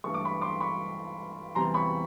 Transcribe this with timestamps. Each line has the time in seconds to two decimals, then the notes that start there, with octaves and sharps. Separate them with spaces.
0.04 G2 E3 A3 C#6
0.14 D6
0.25 B5 C#6
0.42 C6 D6
0.60 B5 C#6
1.55 E2 C3 E3 G3 A#5 C6
1.74 B5 C#6